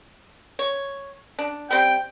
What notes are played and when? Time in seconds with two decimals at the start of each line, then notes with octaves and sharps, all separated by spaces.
0.59 C#5
1.39 D4
1.70 G3 C4 G5